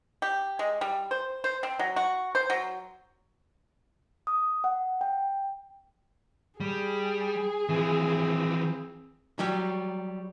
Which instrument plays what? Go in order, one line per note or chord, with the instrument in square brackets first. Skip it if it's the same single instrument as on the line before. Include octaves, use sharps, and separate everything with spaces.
[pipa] G4
G#3
G3
C5
C5
C4
F#3
F#4
C5
F#3
[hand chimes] D#6
F#5
G5
[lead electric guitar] G3 [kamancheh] G#4
[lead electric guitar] E3 F3 [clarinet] C4
[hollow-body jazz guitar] F#3 G3 G4